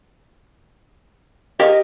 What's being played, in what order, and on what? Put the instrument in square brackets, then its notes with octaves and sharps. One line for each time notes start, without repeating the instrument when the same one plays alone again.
[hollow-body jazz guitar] G4 A#4 F5 [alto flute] D#5